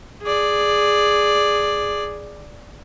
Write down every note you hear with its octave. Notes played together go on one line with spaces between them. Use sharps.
G#4 D5